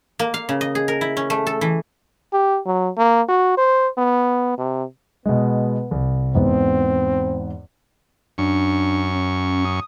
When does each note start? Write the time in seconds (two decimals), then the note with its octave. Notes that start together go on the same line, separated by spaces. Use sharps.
0.19 A#3
0.34 F5
0.49 C#3
0.61 D#5
0.75 G#4
0.88 A#4
1.01 E4
1.17 C#4
1.30 A3
1.47 A4
1.61 E3
2.33 G4
2.66 F#3
2.97 A#3
3.29 F#4
3.58 C5
3.98 B3
4.58 C3
5.26 B2 G#3 B3
5.91 C2
6.35 E2 G#2 B3 C4
8.38 F#2 D4 C#6
9.15 C#4
9.65 D#6